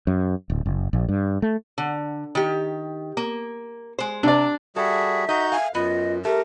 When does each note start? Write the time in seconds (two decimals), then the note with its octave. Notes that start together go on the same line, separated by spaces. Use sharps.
0.07 F#2
0.50 D1
0.66 F#1
0.93 A#1
1.09 G2
1.42 A3
1.78 D3
2.35 D#3 G4
3.17 A#3
3.99 G#3 C5
4.23 C3 D4 D5
4.76 G3 F#4 G#4 A4 E5
5.29 D#4 F#4 D#5 G6
5.52 E5 F5 G#5
5.75 F#2 B3 F4 D#5
6.25 A3 G4 A#4